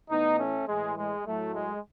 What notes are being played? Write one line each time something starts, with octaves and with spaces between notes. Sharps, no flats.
A2 E3 B3 D#4
A3 C#4
A2 E3 G#3
G#3
A2 F#3 A3
G#3